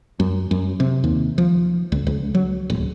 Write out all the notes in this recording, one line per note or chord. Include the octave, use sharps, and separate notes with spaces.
F#2
F#2
C3
D#2
F3
C#2
C#2
F#3
D1